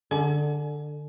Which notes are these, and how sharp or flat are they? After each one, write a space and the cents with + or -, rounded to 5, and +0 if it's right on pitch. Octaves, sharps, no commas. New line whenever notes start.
D3 +10 G#5 +40